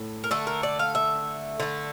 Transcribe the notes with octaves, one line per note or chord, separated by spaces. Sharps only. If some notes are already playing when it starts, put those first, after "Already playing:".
Already playing: A2
A#4
D3 A3 A4
A#4
D5
F5
E5
D3 A3